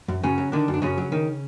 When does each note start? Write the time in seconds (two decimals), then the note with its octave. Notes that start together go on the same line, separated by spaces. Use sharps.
0.08 F#2
0.23 F#2 C#3 C#4
0.38 F#3
0.52 D3 D#3 D4
0.68 F#2
0.74 D4
0.82 F#2 C#3 C#4
0.98 F#3
1.12 D#3